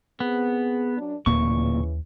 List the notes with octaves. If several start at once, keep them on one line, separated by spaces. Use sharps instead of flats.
B3 C4 G#4
F#2 D4
D1 D#2 A#2 C#3 E3 A#3 C#6